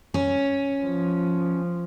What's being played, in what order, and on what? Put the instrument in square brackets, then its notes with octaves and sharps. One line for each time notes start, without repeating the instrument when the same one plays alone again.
[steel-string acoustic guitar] C#4
[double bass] F3